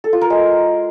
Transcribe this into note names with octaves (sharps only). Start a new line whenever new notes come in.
A4
F4
A#4
G#3